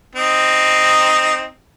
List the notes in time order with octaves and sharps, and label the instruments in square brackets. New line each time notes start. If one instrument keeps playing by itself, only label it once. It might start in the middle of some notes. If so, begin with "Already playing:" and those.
[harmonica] C4 D#4